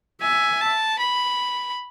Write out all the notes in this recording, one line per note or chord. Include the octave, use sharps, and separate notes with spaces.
E5 G#5
A5
B5